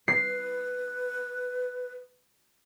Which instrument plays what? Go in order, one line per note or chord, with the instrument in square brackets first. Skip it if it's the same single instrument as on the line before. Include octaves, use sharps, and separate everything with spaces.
[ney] B4 [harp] C7